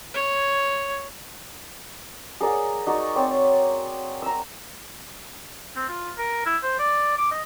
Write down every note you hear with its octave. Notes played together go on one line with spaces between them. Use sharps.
C#5
G#4 A#4 D5 F#5
D#4 F#4 D5
C4 C#5 D5
A#5 E6
C4
F4
A#4
E4
C5
D5
D6
D#5